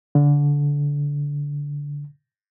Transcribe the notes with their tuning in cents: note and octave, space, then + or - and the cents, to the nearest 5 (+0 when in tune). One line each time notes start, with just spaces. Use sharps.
D3 -20